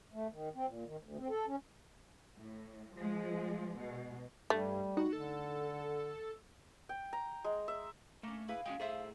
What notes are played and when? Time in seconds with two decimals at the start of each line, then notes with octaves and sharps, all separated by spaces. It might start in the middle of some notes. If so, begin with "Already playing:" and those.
0.14 A3
0.32 D#3
0.55 C4
0.67 A#2
0.85 D#3
1.03 D2
1.17 C4
1.29 A4
1.47 C#4
2.38 A2
2.96 F3 G#3
3.77 B2
4.50 G2 G3 A3
4.97 D#4 F#4
5.13 D3 A4
6.89 G5
7.13 A#5
7.44 G#3
7.68 E5
8.23 A3 A#3 C#4
8.48 E4 G#4 B4 F5
8.66 G#3 C#4 F#4 G5
8.80 A2 G#4 A4 C5 E5